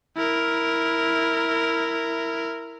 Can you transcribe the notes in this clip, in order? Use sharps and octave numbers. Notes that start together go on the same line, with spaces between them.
E4 A#4